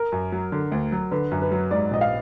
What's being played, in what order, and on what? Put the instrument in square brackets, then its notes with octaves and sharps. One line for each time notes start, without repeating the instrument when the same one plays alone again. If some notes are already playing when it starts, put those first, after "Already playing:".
Already playing: [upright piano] A#4
[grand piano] F#2
F#3
D3
D2
F#3
[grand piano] D3 [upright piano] B4
[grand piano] F#2
[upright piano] B4
[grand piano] F#3
[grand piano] G#2 [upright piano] D5
[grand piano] A#1 [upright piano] D#5
[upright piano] F5